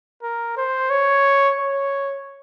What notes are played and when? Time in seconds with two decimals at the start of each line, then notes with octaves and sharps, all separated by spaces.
0.22 A#4
0.57 C5
0.90 C#5
1.59 C#5